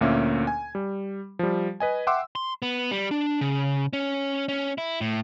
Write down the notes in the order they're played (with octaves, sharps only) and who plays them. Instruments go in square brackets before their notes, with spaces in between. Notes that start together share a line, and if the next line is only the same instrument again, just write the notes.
[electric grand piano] D2 A#2 A#3 C#4 E5
G#5
G3
F3 G3
B4 D#5 G#5
E5 F#5 G5 C6 D6 E6
[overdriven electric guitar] C6
B3
G3
D4
C#3
C#4
C#4
E4
A2